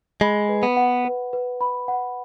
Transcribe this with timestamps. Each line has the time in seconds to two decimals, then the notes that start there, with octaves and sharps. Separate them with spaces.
0.21 G#3 B5
0.49 B4
0.63 B3
0.77 F#5
1.05 B4
1.33 B4
1.61 B5
1.88 F#5